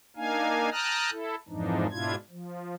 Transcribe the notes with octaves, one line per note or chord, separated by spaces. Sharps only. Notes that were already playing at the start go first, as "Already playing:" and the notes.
A#3 D4 D#4 F5 G#5
G5 A5 A#5 D#6 F6 F#6
E4 A4
F2 G#2 E3 F3 D4 D#4
G#2 B2 D4 E4 F4 G#6
F3